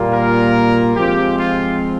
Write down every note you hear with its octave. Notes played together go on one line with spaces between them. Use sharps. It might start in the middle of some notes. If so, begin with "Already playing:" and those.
Already playing: A#2 G3 A#3 F4
A#4
F3 G#3 C4 F4 G4
F4